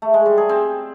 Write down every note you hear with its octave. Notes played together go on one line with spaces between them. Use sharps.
A3
G#3
G3
G#4
C4